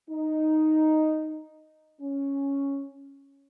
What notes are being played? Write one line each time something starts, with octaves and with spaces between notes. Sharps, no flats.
D#4
C#4